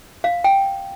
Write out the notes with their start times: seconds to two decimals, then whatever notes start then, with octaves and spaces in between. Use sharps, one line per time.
0.24 F5
0.44 G5